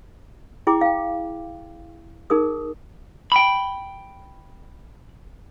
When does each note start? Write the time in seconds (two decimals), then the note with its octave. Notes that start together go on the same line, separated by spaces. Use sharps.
0.67 E4 G#4 G5 B5 D6
0.81 F5 G5
2.30 D#4 G#4 A#4 D#6
3.32 G5 B5